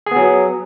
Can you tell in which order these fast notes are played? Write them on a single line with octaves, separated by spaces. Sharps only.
G#4 B3 F#3